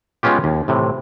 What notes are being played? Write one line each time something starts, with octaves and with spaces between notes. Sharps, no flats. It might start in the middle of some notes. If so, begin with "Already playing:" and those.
G#3 B3 C#4 F4 G4
D#2
A2 C3 E3